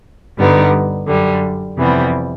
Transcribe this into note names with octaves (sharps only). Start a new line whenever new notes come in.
G2 D3 G3 B3 D#4
F#2 D3 G3
F2 C3 E3 G3 B3